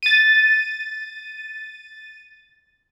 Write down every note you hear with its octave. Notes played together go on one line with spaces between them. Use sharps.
A6 D#7